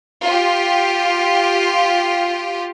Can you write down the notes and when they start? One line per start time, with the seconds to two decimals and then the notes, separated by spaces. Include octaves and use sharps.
0.23 F4 G4